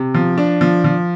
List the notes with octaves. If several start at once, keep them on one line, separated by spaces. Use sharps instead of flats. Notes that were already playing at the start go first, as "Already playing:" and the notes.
Already playing: C3
F3
D4
F3
F3